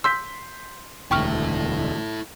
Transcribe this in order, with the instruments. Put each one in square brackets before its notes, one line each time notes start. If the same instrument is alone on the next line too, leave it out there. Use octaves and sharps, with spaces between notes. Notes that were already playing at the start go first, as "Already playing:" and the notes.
[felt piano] C6 G6 B6 [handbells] E6
[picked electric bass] E1 D2 [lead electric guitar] E4 A4 [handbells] G5 C#6 F6